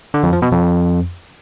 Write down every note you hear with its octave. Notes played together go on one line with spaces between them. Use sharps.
D3
F2
F3
B2
F2